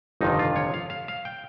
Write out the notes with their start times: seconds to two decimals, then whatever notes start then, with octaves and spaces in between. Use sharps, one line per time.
0.21 G1 F2 C3 D#3 D#4
0.39 F4
0.56 C#5
0.74 F5
0.90 F5
1.08 F5
1.25 G5